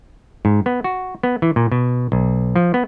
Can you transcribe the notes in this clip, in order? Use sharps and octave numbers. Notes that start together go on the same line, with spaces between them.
G#2
B3
F#4
B3
E3
A#2
B2
B1
F3
B3